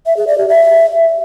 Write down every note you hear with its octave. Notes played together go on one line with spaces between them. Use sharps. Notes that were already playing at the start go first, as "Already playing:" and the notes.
E5
G#4
D5
G4
E5